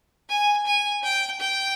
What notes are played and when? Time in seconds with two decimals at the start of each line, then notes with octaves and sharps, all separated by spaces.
0.29 G#5
0.66 G#5
1.03 G5
1.40 G5